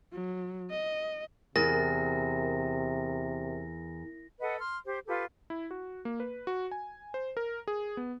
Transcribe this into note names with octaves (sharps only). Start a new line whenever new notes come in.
F#3
D#5
E2 C3 A#4 A#6
A4 B4 D#5 F#5
C6 F6
G4 C5
F4 G4 A4 B4
E4
F#4
A#3
B4
F#4
G#5
C5
A#4
G#4
B3